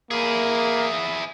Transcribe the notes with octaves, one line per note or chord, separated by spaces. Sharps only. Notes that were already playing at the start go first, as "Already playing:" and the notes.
A#3 E4 G#4